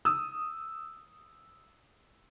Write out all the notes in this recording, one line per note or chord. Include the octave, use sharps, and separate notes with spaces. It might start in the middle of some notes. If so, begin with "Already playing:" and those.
D#6 E6